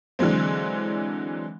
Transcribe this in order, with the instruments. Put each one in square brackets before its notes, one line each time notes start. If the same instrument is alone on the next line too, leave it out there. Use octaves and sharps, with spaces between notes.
[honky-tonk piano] D3 E3 F#3 G#3 C4